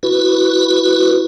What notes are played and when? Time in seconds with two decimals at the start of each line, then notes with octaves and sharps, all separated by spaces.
0.03 E4 F#4 B4